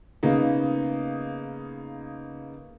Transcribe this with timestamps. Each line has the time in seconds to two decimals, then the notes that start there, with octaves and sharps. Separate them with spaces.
0.23 C#3 A#3 B3 D#4